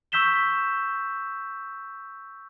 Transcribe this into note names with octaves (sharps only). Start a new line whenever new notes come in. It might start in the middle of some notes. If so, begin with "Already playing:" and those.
C#6 E6 G6 B6 E7 G7